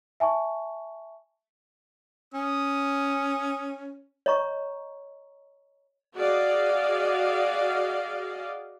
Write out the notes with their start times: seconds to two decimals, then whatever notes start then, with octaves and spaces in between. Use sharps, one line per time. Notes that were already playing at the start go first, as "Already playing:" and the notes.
0.20 E5 G#5 A5 C#6
2.34 C#4 D#6
4.26 C#5 D#5 A#5 C#6
6.15 F#4 G#4 D5 D#5 F5